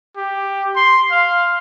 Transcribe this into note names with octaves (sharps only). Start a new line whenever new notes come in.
G4
C6
F5